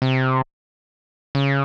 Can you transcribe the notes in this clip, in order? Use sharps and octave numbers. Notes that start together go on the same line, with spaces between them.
C3
C#3